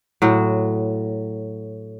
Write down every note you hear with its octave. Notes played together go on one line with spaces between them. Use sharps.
A2 F#3